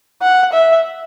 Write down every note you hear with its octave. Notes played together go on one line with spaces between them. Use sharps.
F#5
E5